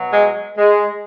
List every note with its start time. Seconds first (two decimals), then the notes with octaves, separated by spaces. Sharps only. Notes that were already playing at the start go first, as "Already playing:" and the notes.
Already playing: B2 F#3
0.12 G#3
0.57 G#3